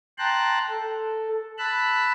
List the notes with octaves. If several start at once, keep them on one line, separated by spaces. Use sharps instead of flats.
G5 A5 A#5 C6 F#6
A4
A5 B5 E6 F#6